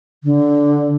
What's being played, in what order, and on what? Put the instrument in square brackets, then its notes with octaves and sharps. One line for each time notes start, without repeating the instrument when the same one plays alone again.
[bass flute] D3